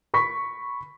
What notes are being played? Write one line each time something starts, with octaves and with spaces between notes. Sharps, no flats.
B5 C#6 B6